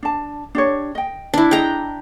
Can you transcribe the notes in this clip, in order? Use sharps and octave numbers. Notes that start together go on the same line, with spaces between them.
D4 A5
D4 G4 C#5
D#5 G5
D4 E4
G#4 D#5 G5 A#5